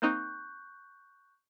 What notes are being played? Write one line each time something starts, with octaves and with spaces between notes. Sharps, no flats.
A#3 C4 D#4 C#6 F#6 G6